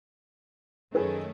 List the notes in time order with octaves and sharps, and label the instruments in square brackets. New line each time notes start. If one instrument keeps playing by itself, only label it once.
[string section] F#2 D#3 A3 C#4 [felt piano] G#4 B4